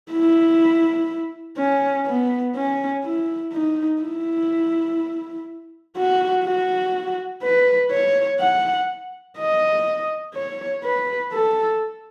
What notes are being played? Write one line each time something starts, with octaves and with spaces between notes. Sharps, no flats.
E4
C#4
B3
C#4
E4
D#4
E4
F#4
F#4
B4
C#5
F#5
D#5
C#5
B4
A4